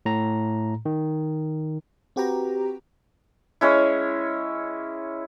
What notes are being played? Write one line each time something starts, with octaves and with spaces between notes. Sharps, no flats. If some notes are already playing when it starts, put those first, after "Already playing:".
A2 A#5
D#3
C4 F#4 G4 B4 G5 A#5
G#3 C#4 E4